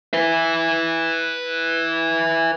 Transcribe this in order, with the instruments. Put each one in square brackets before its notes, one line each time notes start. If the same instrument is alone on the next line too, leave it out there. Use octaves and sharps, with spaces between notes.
[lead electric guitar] B4 E5